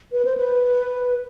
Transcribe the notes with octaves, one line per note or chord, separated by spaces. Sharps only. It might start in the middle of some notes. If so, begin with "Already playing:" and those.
B4
C5
B4